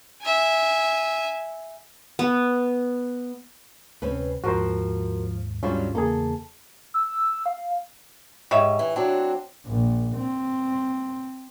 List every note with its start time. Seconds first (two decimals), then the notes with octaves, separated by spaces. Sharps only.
0.22 E5 G#5
2.19 B3
4.02 D2 C3 C4 C#4 B4
4.44 D#2 G#2 F3 F#4 A#4 C5
5.63 D3 F#3 G3 C#4 F4 C5
5.95 E2 C#3 A#3 G#4 A4
6.94 E6
7.46 F5
8.51 G#2 G4 C#5 E5
8.79 E3
8.96 F#3 C4 D4
9.66 A#1
10.16 C4